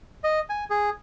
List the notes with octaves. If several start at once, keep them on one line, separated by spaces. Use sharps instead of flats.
D#5
G#5
G#4